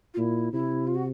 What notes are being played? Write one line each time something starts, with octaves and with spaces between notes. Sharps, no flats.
F4
A#2 E4
C3 E4
F4
F#4